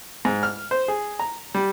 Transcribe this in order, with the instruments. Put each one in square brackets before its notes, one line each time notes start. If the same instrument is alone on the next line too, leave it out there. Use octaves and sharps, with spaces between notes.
[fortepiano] G#2
F6
C5
G#4
A#5
G3